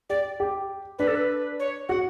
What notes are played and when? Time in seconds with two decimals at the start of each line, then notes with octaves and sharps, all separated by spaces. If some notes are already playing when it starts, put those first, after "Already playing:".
0.10 G4 D5
0.40 G4
0.99 D4 B4
1.08 A4
1.15 B4
1.60 C#5
1.89 F#4 F#5